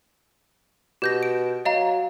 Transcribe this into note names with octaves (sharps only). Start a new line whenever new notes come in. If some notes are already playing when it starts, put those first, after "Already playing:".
B2 G4 G6 A#6
D7
F#3 D#5 F5 A#5